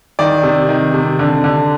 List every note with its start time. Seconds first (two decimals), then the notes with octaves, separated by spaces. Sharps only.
0.19 D#3 D5
0.43 C3
0.69 D#3
0.94 C3
1.19 D3
1.44 D3